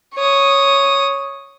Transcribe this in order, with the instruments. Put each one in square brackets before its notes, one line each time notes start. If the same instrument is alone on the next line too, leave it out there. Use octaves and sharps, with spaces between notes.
[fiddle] C#5 D#6